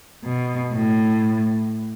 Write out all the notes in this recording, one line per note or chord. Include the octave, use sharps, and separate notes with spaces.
B2
A2